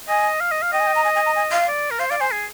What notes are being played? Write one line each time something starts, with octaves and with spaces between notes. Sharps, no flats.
D#5 G#5
F5
D#5
F5
D#5 G5
G#5
G5
A#5
G#5
G#5
A#5
G#5
F5
D5
A#4
C5 F5
D5 F5
C5 G#5
G#4